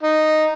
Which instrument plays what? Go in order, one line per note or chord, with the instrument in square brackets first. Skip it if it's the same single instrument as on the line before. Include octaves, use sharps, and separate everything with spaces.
[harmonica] D#4